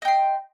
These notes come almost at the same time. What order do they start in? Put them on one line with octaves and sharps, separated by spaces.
D#5 G5 C6